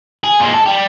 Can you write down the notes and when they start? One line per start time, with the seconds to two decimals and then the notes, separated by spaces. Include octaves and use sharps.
0.24 G#4
0.40 A#2 G#3
0.53 A4
0.66 G3 G4